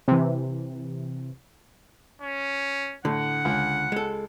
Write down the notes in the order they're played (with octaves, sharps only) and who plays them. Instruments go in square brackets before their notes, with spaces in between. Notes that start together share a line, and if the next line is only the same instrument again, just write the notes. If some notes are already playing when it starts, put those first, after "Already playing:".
[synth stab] C3 E3
[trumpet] C#4
[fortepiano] A2 [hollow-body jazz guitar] D3 [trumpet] F#5
[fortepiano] C#2
[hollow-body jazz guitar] G#3 A4